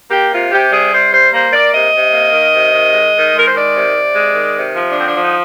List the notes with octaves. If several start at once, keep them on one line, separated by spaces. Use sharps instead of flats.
A#3 G4
C3 F4
C3 G4
G3 G#4
C3 C5
G3 C5
A#3 C5
A#3 D5
C3 D#5
C3
A#3
D#3
C3
D#3
G#3
D#3
G#3 A#4
C5
D#3 D5
C3
C3
G#3
D#3
C3
F3
D4
D3 C4
D4
F3 D#4